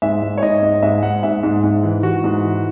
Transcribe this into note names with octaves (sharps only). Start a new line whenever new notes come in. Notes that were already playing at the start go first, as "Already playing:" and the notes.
G#2 E5
G#2
C#5
G#2 D#5
G#2
G#2 E5
G#2 F#5
G#2 E5
G#2
G#2
E3
E3 F#4
G#2
E3